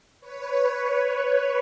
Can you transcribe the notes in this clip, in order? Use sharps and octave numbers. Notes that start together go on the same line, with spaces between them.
B4 C#5